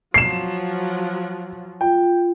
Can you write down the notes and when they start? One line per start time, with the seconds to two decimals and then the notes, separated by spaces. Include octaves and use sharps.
0.14 F3 F#3 C7 E7
1.81 F4 G5